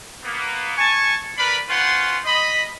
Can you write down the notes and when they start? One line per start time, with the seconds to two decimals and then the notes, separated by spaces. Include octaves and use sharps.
0.23 A#3 B3
0.77 G#5 A5 C#6
1.37 A#4 B4 D5 B5
1.69 C#4 F4 B4 C5 F#5 C6
2.25 D#5 B5